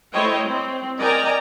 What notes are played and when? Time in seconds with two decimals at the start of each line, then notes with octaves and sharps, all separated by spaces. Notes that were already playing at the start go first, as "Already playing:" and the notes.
0.11 A3 E4 C5 C#5 D#5 G5
0.46 C4
0.98 A#4 D5 D#5 G5 G#5 A#5